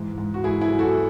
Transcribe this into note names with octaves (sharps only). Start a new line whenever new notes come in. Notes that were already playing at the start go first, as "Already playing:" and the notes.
Already playing: G#2 E3
G#2
F#4
G#2 E4 G#4
E4 G#4
F#3
F#4 A4